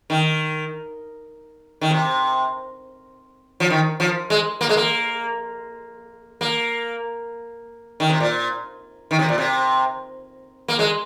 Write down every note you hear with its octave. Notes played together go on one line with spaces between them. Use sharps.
D#3
D#3
C3
F3
D#3
F3
G#3
A#3
G#3
A#3
A#3
D#3
C3
A#2
D#3
C3
A#2
C3
A#3
G#3